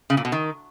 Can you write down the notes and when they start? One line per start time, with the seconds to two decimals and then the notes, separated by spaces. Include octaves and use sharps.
0.10 C#3
0.17 A#2
0.25 B2
0.32 D#3